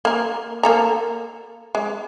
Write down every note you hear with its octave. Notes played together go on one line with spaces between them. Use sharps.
A#3 A#4
A#3 A4 A#5
G#3